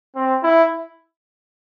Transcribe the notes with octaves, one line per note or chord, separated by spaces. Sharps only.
C4
E4